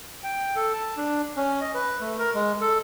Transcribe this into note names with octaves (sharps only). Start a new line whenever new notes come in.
G5
A4
A5
D4
C#4
D#5
B4
A3
A#4
G#3
A4